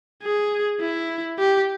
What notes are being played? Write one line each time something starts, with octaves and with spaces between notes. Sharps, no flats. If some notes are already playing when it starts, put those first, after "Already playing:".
G#4
E4
G4